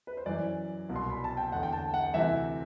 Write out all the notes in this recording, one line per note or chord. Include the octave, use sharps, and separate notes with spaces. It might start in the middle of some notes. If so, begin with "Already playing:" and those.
B4
C5
F#2 E3 D5
C2 B2
C6
B5
A5
G5
E2 D3 F#5
G5
A5
F#5
D2 C3 E3 E5